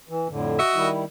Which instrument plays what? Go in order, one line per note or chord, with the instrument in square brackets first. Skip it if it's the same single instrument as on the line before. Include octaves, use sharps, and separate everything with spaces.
[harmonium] E3
F2 A2 D3
[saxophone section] F#4 D#5 E5
[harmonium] D#3 G3 E4